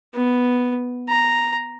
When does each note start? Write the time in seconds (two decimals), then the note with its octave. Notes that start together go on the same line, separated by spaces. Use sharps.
0.13 B3
1.08 A#5